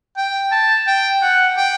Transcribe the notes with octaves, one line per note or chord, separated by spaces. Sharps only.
G5
A5
G5
F#5
G5